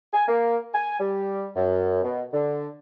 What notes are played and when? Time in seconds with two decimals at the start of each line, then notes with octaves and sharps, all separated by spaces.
0.13 G#5
0.28 A#3
0.73 G#5
1.00 G3
1.56 F#2
2.03 B2
2.32 D3